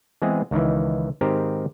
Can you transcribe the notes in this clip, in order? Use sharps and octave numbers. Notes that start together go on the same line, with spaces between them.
E3 G#3 B3 C4 G#4
C#2 D#3 E3
G#2 D#3 C4 G4 A#4 C5